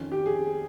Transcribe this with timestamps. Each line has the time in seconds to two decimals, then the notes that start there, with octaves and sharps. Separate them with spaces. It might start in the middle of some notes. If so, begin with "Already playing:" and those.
Already playing: F2 D#3 C#4
0.12 G4
0.26 G#4